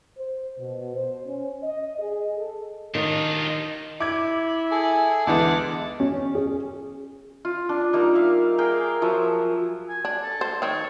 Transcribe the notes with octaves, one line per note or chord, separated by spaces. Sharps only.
C5
B2
C5
C#4
D#5
G#4
A4
D#3 D4 D#4 F4
E4 D6 G#6
G#4 A4 G#5
D2 E3 G#3 B3 F#5 A5 D6
C#4
G#4
F4
D4
G3 A#3 D#4
E5 F5
G#4 A#4 F5 G5
F3 F#3 E5
G#5
D4
A4
C5
D#3 C4 C#5